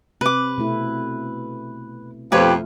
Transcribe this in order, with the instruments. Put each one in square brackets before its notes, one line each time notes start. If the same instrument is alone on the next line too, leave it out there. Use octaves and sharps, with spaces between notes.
[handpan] C3 [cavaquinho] B4 D6
[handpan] B2 A3 E4
[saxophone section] F2 B2 F3 [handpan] A3 F4 [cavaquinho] G4 B4 C#5